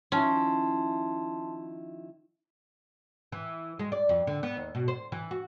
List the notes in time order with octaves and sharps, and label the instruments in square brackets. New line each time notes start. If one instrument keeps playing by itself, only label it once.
[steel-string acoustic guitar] D#3 F3 E4 [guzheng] C#4 [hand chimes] A5 C6
[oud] E3
G#3
D5
F2
D3
B3
D#2
B2
C5
E3
F#4